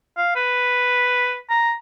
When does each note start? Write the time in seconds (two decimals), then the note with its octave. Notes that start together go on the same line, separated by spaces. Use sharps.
0.17 F5
0.36 B4
1.50 A#5